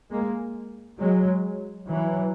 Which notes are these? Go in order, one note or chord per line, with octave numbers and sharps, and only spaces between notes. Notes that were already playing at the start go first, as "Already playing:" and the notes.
G#3 A#3
F#3 G#3
E3 F#3